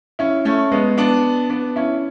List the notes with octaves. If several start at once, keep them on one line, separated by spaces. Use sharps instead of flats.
C#4 E4
A3 C#4
G#3 B3
B3 D4
B3 D4
C#4 E4